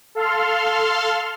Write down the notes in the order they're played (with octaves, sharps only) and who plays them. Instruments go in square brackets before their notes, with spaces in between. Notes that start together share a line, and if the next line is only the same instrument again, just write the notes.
[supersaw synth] A4 F5 C6 F6